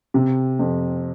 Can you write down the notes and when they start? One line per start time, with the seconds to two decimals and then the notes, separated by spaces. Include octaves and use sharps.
0.14 C3
0.59 F2